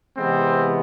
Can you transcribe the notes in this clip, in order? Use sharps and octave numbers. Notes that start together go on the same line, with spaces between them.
C3 E3 G#3 B3 C4